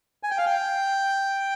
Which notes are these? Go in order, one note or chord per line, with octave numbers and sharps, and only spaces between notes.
G#5
G5
F5
G5